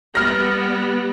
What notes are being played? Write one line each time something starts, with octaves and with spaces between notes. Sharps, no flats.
G3 B3 F6 A#6